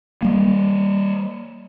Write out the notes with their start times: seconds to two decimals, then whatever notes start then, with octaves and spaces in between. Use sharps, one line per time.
0.22 G3 A#3